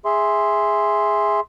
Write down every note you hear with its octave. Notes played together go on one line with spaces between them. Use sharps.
G#4 E5 C6